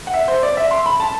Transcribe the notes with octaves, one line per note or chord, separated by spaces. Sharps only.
F#5
E5
C5
D5
E5
C6
B5
A5